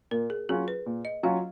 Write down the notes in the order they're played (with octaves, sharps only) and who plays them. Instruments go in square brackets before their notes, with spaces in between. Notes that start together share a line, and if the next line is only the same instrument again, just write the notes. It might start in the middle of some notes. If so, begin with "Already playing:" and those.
[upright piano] A#2 [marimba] A#4
[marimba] G#4
[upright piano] F#3 C#4 F4 [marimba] G#4
[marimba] B4
[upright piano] A#2
[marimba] D#5
[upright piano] F#3 C#4 F4 [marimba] F5